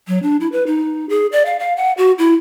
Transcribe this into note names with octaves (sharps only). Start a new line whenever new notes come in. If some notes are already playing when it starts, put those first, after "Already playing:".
F#3
D4
E4
B4
D#4
G#4
D5
F5
F5
F#5
F#4
E4